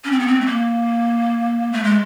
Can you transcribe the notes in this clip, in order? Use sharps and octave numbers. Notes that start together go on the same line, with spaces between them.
C#4
C4
B3
C4
A3
A#3
A3
G#3